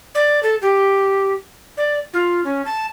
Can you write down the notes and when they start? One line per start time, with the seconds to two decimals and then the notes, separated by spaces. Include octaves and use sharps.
0.15 D5
0.43 A4
0.62 G4
1.77 D5
2.13 F4
2.44 C#4
2.65 A5